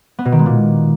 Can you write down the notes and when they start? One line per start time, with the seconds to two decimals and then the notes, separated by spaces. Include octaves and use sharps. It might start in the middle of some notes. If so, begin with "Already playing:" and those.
0.19 B3
0.25 B2
0.32 D#3
0.39 G#3
0.46 A#2